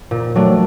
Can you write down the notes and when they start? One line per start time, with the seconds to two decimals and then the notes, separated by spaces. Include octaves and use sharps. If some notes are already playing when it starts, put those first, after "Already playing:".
0.11 A#2
0.35 F#3 A3 D4